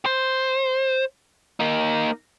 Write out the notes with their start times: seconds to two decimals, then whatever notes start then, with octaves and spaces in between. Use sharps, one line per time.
0.06 C5
1.60 A#3 D#4